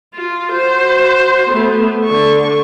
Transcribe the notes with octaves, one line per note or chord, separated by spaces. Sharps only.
F4
F#4 C5
A3 B3
D3 C#6